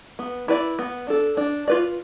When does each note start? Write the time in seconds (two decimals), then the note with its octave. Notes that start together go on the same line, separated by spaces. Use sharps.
0.19 B3
0.48 E4 B4 D5
0.79 B3
1.07 D4 A4
1.37 D4
1.68 F4 B4 D5